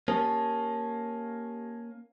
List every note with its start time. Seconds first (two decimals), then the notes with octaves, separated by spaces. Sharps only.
0.08 A#3 C#4 G4 A5 D#6